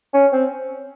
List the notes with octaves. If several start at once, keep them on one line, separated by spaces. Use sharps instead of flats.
C#4
C4